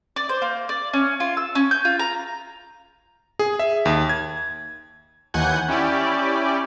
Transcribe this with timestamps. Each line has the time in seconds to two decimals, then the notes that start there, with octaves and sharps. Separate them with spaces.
0.16 D5
0.29 C5
0.42 A#3
0.69 D5
0.93 C#4
1.20 F4
1.37 E6
1.55 C#4
1.71 G6
1.85 F4
1.99 A#5
3.39 G#4
3.59 E5
3.85 D#2
4.09 G#6
5.34 D#2 E3 F#5 G#5 G6
5.68 C#4 E4 G4 D5